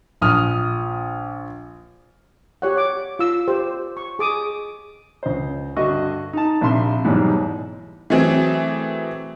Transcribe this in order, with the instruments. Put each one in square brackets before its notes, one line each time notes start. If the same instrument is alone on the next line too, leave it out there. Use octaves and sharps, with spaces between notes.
[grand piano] A#1 D#6 F6
[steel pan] G4 C#5 F#5
D6
F4 E6
G4 C5
C#6
G#4 D6 D#6
[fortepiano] C#2 C5
G2 D3 F#4 D#5 E5 C#6
D#4 A5
A#1 C3 E5 C6
E2 G#2 B2 F#3 G3
[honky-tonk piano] E3 F#3 A3 C4 G#4